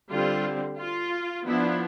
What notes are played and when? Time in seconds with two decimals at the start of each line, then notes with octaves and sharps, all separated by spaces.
0.10 D3 G3 C4 F4
0.79 F4
1.46 F3 B3 D4 E4